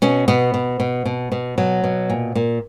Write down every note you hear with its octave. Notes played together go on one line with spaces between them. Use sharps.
B2 C#4
B2 B3
B2
B2
B2
B2
B2 F#3
B2
A#2
A#2